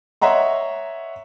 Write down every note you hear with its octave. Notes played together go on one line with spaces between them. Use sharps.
C#5 D#5 E5 F#5 A#5 C6